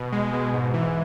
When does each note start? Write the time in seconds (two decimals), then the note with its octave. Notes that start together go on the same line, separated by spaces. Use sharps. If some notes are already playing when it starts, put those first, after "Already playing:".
Already playing: B2
0.13 G#3
0.33 B2
0.54 G#2
0.74 E3